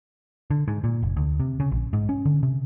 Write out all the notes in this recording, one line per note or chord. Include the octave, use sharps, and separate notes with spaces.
D3
G#2
A#2
F1
D2
C3
C#3
A#1
G#2
C#4
D3
C3